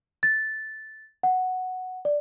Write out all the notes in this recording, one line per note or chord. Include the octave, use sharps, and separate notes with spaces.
A6
F#5
D5